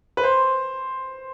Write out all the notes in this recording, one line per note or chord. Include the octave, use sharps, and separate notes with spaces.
B4
C5